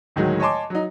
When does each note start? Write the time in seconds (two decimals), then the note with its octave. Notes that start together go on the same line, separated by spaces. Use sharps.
0.16 D2 A2 D#3 F#3 G#3
0.40 C#5 D#5 G#5 A5 C6 D6
0.70 F#3 D#4